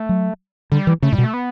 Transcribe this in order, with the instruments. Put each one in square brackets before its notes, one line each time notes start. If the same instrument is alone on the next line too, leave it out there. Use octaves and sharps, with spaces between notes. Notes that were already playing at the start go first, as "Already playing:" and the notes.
Already playing: [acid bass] A3
[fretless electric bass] F#3
[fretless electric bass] D3 [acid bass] G3
[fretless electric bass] E3
[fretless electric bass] C#3 [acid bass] A3
[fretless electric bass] A2 [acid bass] G3
[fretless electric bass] B2
[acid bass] A3
B3